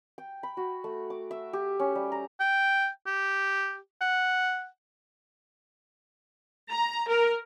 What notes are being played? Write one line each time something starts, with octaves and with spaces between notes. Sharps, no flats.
G5
B5
F#4
A3
D6
E5
G4
C#4
G3
A#5
G5
G4
F#5
A#5
A#4